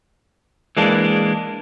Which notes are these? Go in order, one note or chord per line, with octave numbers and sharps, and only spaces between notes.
E3 G#3 A#3 D4